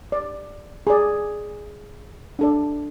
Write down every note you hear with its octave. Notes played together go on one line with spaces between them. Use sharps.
D5
G#4 D5
D4 A4 D5